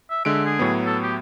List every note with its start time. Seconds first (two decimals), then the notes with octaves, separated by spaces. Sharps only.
0.10 E5
0.25 D3 G#3 E5 D7
0.45 G#4
0.59 A2 F#3 B3
0.85 A4
1.03 G4